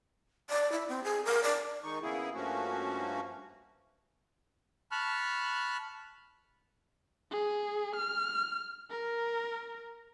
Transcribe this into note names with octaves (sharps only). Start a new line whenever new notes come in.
D5
E4
C4
G#4
A#4
D5
D#3 G#3 D#4 C#6
C#3 A#3 B3 E4 G#4
G2 F3 A3 A#3 C#4 F#4
A5 B5 C#6 F6 F#6
G#4
F6
A#4